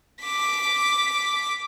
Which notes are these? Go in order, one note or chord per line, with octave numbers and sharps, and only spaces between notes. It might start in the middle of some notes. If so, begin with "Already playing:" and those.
D6 B6